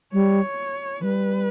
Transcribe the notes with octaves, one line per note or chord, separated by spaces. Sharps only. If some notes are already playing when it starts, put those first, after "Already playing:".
G3 C#5
E3
G3 B4